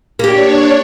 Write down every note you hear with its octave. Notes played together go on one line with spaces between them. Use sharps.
A#3 D4 G4 C#5